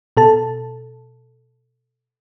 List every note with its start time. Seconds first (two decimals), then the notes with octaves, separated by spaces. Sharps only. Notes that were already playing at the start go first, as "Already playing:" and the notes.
0.17 B2 A4 A5